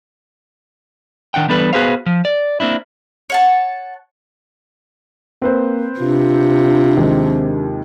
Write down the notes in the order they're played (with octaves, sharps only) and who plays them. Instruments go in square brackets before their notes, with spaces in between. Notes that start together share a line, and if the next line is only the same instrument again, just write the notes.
[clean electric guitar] D#3 D4 F#5 G5
E3 G3 B3 D4 A4 B4
B3 F#4 G#4 B4 C5 F5
F3
D5
A#3 C4 D4 E4
[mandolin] C#5 F#5 A5
[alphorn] A#3 [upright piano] C4 B4 C5
[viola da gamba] C3 [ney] D4 [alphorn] F4
[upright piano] D#2 F3 G#3 [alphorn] C4